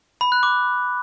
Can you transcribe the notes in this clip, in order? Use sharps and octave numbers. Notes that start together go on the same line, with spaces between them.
B5
F#6
D6